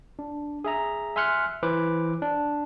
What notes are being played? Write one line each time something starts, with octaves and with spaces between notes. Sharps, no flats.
D4
G#4 E5 A#5
E5 G#5 C6 F6 F#6 C#7
E3 B4 C5 D6
D4